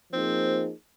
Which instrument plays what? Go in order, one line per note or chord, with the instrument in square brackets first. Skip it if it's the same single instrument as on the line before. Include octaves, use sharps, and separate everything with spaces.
[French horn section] F3 A#3 D#4 G#4 [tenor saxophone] C4